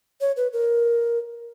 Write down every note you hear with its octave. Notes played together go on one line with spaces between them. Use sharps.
C#5
B4
A#4